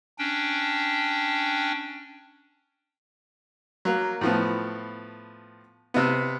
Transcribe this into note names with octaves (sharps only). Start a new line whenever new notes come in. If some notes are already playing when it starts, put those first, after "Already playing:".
C#4 D4 G5
F#3 A#3
A2 F3 B3
C3 B3